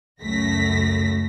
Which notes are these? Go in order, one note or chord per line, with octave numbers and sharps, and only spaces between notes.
C#2 F#2 A3 A#6 B6